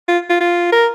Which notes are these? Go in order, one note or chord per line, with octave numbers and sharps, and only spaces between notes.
F4
F4
F4
A#4